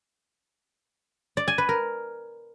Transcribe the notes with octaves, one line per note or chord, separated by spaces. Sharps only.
D5
G#5
B4
A#4